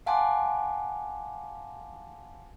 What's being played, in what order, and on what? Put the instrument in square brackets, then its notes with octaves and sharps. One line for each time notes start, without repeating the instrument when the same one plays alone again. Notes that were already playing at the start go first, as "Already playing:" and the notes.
[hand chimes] F5 F#5 G#5 A5 C6 D6